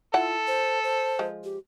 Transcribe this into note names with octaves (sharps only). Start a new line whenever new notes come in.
E4 F4 A4 F#5 A5
C5
C5
F3 G#3
G4